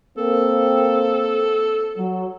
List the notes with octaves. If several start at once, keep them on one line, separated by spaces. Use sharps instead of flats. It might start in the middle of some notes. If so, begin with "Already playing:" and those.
A#3 C4 A4
F#3